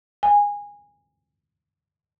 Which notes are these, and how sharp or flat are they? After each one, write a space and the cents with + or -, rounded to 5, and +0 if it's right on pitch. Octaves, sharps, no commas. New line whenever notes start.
G#5 -20